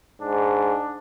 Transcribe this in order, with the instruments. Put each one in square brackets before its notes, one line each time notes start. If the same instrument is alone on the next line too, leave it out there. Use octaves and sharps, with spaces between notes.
[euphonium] G#2 [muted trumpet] D4